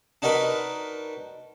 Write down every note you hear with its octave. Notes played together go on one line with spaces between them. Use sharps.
D4 D#4 F#4 A#4 B4